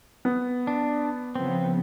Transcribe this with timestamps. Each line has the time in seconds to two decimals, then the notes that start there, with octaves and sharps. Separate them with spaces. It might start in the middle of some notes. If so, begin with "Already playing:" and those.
0.25 B3
0.67 D4
1.36 C#3 F3 B3 C4